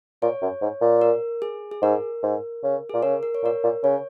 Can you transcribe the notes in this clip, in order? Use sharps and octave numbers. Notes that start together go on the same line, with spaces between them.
A#2 C#5
F#2
G#2
A#2
A#4
G#4
G#4
G#2 A#4
G#2
C#3
A#2 G#4
C#3 A#4
A#4
C#5
A#2 A#4
A#2
C#3 C#5